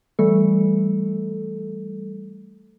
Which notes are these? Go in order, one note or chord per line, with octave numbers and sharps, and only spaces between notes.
E3 G3 A3 A4